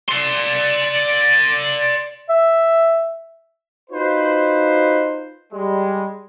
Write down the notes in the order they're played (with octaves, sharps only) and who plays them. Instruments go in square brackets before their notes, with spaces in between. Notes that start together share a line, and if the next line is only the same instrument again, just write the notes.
[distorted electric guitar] D5 C6
[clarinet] E5
[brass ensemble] D#4 F4 F#4 B4 C5
G3 G#3